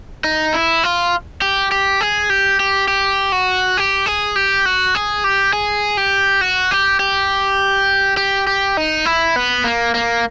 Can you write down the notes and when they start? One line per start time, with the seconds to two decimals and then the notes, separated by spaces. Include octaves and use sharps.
0.24 D#4
0.54 E4
0.83 F4
1.42 G4
1.72 G4
2.01 G#4
2.30 G4
2.60 G4
2.88 G4
3.32 F#4
3.77 G4
4.06 G#4
4.36 G4
4.65 F#4
4.95 G#4
5.24 G4
5.53 G#4
5.97 G4
6.41 F#4
6.71 G4
7.00 G4
8.17 G4
8.47 G4
8.77 D#4
9.05 E4
9.36 B3
9.64 A#3
9.95 A#3